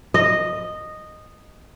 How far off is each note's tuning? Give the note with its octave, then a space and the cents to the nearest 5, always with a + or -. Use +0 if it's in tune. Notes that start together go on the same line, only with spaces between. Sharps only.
D#5 -10